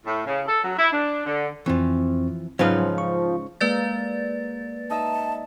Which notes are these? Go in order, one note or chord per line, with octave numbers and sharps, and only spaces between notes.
A2
C#3
A4
F#3
E4
D4
D3
F2 E3 F3 C4 C#6
G#2 C#3 F3 F#3 C#4 D#4 B4
C#6
G#3 A#3 B4 D5 A6
D#4 D#5 E5 A5